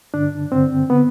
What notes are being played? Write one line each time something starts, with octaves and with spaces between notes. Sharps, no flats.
G2 D3 D4
G2 D3 C4
D3 B3